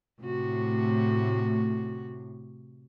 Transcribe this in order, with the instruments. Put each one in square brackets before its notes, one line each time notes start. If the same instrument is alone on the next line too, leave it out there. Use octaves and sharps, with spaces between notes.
[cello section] A2 [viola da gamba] C3 F#4